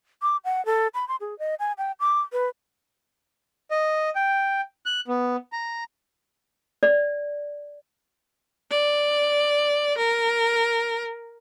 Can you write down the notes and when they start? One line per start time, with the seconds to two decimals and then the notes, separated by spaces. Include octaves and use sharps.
0.22 D6
0.45 F#5
0.66 A4
0.94 B5
1.08 C6
1.21 G#4
1.39 D#5
1.60 G#5
1.78 G5
2.00 D6
2.32 B4
3.71 D#5
4.16 G5
4.86 F#6
5.08 B3
5.52 A#5
6.83 D5
8.71 D5
9.97 A#4